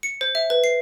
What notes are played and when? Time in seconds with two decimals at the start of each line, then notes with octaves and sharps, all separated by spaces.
0.03 C#7
0.21 C5
0.35 E5
0.50 B4
0.64 C7